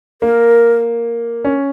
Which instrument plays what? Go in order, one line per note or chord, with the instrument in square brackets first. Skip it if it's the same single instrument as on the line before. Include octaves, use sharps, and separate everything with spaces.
[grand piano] A#3 [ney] A#4
[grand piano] C#4